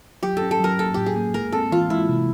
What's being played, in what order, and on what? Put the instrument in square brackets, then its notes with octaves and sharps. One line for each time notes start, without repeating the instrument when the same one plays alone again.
[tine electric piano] F#3 [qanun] G4
[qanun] A4
[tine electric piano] C#4
[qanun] A4
[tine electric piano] F#3 [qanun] A#4
[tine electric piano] A#3 [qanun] A4
[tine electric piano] A2 [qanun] G4
[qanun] G#4
[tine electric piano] A#3
[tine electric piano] G#3 [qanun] A#4
[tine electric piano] C4 [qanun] A4
[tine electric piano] E3 [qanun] F4
[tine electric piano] G#3 [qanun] E4
[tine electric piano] C3